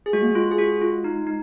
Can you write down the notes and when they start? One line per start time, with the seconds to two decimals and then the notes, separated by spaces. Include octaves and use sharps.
0.06 G#4
0.13 G#3 F#4
0.22 A#3
0.31 G#3 F4
0.51 G#4
0.58 F#4
0.82 F4
1.04 D#4
1.27 D#4